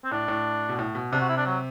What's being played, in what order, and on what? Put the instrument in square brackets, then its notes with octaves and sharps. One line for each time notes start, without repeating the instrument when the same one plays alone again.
[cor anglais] C4
[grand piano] A2 [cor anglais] D4
[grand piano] A2
B2
A2
B2
[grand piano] C3 [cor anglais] D4
[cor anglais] F#4
E4
D4
F#3